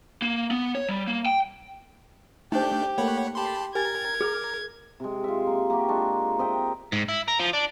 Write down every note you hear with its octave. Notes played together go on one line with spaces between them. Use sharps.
A#3
B3
C#5
G3
A#3
G5
A3 D4 D#4 G4 C5 G6
A3 A#3 A4 C#5 F#5 B5
G4 A5 B5 C6
G4 A#4 G#5 G#6 A6
G#4 D6 F6
C3 G#3
F4 E5
A#3
A#3 F#4 G4
G#3 D4 F4 F#4
C4 D#5 E5 G5
G#2
E4
A#4
F3
D4